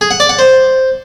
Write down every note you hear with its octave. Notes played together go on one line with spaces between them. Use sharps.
G#4
F#5
D5
F#5
C5